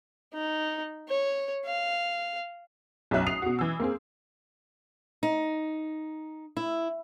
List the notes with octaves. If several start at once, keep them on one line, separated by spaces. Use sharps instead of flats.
D#4
C#5
F5
B1 F#2 F#3 E5 F#6
D#6 C7 F7
B2 F#4
E3 E6
A#3 C4 G#4
D#4
E4